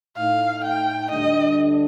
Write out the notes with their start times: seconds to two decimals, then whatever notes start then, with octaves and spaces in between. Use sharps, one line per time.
0.17 A2 A3 D#4 F5
0.65 G5
1.11 D2 D3 G3 D4 D#5